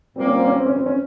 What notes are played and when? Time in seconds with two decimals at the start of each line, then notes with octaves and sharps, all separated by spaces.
0.16 A#2 G3 A#3 C4
0.26 C#4
0.36 C4
0.46 C#4
0.56 C4
0.66 C#4
0.76 C4
0.86 C#4